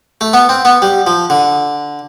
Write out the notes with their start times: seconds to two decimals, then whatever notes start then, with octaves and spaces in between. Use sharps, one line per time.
0.21 A3
0.33 B3
0.49 C4
0.65 B3
0.82 G3
1.07 F3
1.30 D3